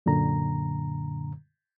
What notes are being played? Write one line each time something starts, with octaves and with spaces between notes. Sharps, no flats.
F#2 A#2 D3 A#5